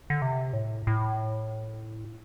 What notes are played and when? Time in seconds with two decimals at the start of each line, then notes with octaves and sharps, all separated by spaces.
0.10 D3
0.22 C3
0.53 A2
0.87 A2